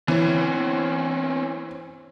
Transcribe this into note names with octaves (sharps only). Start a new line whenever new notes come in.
E3 C4 C#4